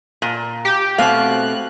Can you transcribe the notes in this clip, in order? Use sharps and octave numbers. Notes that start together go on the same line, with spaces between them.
A#2
G4
B2 A3 C4 F#4 F5 F#6